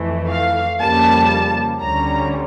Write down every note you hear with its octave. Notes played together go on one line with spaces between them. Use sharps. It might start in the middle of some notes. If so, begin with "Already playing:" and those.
Already playing: F2 E3 A3
F5
F2 C#3 G3 A#3 A5
D2 D3 G3 C#4 A#5